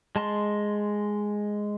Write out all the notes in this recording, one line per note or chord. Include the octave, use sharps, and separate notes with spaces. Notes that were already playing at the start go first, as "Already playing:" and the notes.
G#3 A5 C6